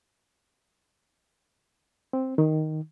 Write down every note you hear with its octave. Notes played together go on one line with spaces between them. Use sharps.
C4
D#3